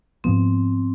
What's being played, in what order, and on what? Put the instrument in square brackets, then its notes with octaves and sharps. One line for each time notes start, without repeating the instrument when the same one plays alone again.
[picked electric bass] G#2 F3 B3 [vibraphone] C4